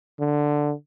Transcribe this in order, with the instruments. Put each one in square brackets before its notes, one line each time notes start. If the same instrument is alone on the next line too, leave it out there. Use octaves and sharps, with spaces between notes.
[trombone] D3